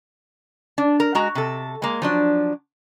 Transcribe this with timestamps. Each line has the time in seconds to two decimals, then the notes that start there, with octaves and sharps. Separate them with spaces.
0.78 D4
1.00 A#4
1.15 G#3 F#4 A#5
1.35 C3 A4
1.82 G#3 A#3
2.02 F3 F#3 D4